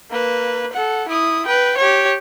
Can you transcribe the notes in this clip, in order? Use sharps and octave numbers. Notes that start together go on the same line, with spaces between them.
A#3 B4
A4 F#5
E4 D#6
B4 G5
G4 C#5